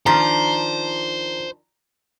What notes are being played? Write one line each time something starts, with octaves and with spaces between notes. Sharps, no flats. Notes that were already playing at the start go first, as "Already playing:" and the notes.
D#3 F3 D4 C5 A#5